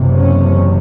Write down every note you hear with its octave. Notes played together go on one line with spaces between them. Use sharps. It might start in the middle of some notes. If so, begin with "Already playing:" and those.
Already playing: F#1 E2 C3
C#4